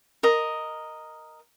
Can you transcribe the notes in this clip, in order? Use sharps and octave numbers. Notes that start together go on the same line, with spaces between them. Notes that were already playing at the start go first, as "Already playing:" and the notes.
A#4 D#5